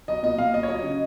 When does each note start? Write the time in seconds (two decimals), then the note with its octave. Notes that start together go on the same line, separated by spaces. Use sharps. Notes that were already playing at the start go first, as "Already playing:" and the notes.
0.08 F#3 D#5
0.23 A#2 D#5
0.38 A#2 F5
0.54 F#3 D#5
0.63 C#5
0.69 F#3 D#5
0.83 C#3